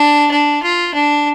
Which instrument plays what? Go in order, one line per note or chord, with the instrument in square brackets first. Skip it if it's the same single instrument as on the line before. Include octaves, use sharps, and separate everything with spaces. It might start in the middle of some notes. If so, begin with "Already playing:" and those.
Already playing: [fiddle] D4
D4
F4
D4